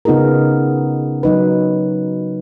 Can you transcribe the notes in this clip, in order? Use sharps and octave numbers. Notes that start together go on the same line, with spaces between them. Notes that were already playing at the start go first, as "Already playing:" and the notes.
C#3 B3 D#4 F4 G#4 A#4
F#3 D#4 B4